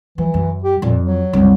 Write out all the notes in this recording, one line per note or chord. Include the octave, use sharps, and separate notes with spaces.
E3 F3
F#2
G4
F2 A#2
F#3
C2 F#2